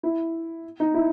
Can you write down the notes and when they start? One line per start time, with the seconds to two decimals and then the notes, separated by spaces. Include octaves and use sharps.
0.03 E4
0.80 D#4
0.94 E4